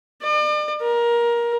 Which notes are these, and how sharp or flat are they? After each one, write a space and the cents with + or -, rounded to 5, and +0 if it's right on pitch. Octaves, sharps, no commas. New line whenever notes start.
D5 +40
A#4 +20